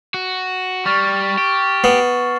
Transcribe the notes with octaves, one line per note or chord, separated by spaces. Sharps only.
F#4
G3 C#6 F6 A6
G4
B3 C7 E7